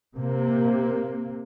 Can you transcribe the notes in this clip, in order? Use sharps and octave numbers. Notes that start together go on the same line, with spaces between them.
C3 A#3